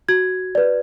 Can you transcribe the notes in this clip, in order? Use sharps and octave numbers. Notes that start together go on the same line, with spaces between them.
F#4 G#6
B4 D5